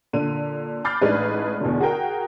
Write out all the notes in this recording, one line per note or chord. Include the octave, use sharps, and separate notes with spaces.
A#2 D3 D#7
B5 D6 F6 G6 A6 C7
A1 G#3 D4 D#4 G#4 B4
E2 B2 D3
F#4 G#4 A#4 G5